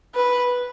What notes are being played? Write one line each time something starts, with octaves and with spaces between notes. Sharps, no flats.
B4